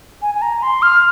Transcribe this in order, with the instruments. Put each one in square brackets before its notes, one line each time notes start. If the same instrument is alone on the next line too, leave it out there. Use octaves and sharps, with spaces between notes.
[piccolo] G#5
G#5
A#5
C6
F6